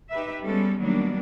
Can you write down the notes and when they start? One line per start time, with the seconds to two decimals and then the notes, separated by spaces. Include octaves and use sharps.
0.11 D#4 G4 B4 E5
0.44 G3 G#3 B3 C#4 A4
0.79 D#3 F#3 G3 A#3 B3 D4